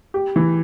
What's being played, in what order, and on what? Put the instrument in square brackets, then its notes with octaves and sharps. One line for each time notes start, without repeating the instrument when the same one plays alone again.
[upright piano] G4
E3